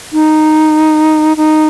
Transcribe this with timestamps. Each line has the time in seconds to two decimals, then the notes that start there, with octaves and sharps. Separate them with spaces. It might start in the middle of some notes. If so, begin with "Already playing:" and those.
0.13 D#4
1.37 D#4